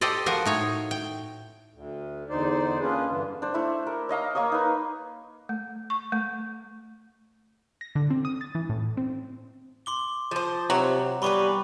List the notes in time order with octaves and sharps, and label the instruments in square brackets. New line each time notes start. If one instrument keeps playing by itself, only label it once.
[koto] G4 A4 C5 D5 D#5
F3 F#4 A#4 C5
A2 D#4 C#5
G5
[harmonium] D2
E2 D3 D#4 C5 D5
A#3 C#4 D4 F4 G#4 B4
G2 D3 E3
[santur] D4 C5
A3 E4
A#4
C#5 D#5 F5 A#5
A#3 C#5 C#6 D#6
D#4 B4
[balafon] A3
C#6
A3
[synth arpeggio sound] A#6
D3
C4
D#6
A6
E3
A2
C4
[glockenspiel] C6 D6 G7
[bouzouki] F3 C5
[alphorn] C3 [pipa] F#3 [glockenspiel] A#5
[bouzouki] E3 B3 B4 [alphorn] G3 [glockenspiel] B5 C#6 D6